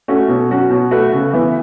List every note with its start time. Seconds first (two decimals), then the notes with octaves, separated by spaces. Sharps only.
0.08 A3 C#4 F#4
0.28 B2
0.50 F#3 C#4 F#4
0.70 B2
0.91 A3 F#4 B4
1.12 C#3
1.33 E3 B3